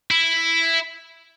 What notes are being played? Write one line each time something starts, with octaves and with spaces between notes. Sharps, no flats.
E4